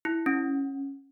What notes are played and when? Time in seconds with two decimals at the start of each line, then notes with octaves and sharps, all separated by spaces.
0.05 E4
0.26 C#4